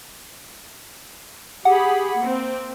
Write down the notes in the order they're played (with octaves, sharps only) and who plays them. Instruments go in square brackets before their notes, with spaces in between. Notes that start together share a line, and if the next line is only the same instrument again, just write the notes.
[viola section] G4 G#4 B5 [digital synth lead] F#5
[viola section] A#3 C4